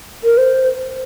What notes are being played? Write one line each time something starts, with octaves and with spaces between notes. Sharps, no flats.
A#4
C5